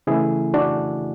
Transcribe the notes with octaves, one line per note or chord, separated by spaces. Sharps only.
C#3 E3 A3 E4 G#4
D4 F#4